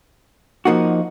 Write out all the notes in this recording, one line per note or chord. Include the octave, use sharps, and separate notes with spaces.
F3 A#3 D#4 F#4